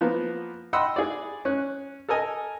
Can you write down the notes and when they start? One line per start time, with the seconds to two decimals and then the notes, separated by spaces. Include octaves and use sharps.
0.01 F3 A#3 B3
0.73 D#5 F#5 G5 B5 C6 E6
0.96 G#4 D5
1.45 C#4 F#6
2.09 A4 A#4 D#5 G#5